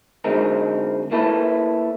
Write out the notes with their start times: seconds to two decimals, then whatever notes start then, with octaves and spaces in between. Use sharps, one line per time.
0.24 D3 F#3 G#3 C4 D#4 A#4
1.11 A#3 E4 A4 B4